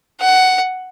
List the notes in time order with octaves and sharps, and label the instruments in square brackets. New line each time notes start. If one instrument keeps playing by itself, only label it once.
[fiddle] F#5